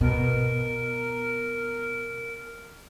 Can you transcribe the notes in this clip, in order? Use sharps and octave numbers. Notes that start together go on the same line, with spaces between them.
B2 A#4